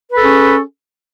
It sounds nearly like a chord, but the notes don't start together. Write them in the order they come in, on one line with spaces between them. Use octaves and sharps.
B4 A4 G#4 C#4